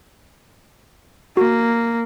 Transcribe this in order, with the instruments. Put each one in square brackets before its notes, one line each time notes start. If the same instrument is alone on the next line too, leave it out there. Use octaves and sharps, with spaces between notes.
[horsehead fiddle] A#3 [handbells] F#4